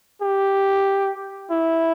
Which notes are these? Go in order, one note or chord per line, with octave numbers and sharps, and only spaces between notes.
G4
E4